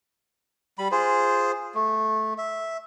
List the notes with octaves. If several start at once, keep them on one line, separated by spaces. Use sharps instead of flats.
G3 B5
F4 G#4 C5
A3
E5